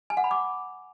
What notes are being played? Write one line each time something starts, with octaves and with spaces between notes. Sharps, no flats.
G#5
F#5
B5
D6